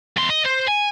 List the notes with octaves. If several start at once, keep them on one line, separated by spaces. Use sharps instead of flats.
E2 C6
D#5
C5
G#5